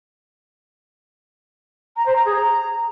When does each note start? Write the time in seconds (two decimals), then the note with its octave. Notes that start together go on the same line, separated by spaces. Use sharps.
1.96 A#5
2.06 C5
2.15 A#5
2.25 G#4
2.35 A#5